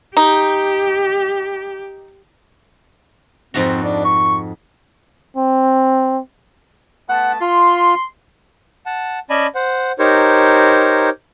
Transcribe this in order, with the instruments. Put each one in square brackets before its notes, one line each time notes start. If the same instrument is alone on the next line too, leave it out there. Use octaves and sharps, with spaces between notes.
[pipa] D#4 [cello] G4
[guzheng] F2 G#2 F#4 [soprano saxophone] C4
[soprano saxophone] D4
C#6
[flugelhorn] C4
[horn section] A3 B3 A5 [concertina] F#5
[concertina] F4 [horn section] C6
[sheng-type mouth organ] F#5 A5
C#4 D5 D#5 G#5 A5 B5
C5 F#5
D#4 G4 A#4 C5 C#5